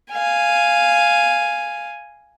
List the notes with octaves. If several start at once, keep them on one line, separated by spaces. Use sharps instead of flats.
F5 G#5